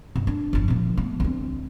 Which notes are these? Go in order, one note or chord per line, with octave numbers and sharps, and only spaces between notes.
G2
D4
G1 F2
A#2 F3
A3 B3
D2 C4